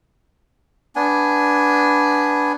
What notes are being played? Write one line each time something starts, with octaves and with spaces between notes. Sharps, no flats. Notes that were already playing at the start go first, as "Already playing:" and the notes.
B3 D4 G#5